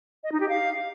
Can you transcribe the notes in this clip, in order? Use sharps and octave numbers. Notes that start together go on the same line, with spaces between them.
D#5
D#4
G4
F5